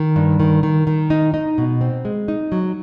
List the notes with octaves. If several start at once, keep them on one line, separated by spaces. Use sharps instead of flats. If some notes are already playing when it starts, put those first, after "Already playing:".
Already playing: D#3
G2
D#3
D#3
D#3
D#4
D#4
B2
C4
G#3
D#4
F#3